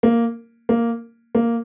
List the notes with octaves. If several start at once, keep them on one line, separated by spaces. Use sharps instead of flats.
A#3
A#3
A#3